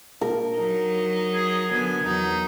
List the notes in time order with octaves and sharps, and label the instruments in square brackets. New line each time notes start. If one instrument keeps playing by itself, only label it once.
[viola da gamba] A#2 [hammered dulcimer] A#4
[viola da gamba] F#3 D#4
[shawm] G#4
[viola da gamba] D3 F#3 B3 [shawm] G#5
[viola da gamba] E2 F#3 [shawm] D#4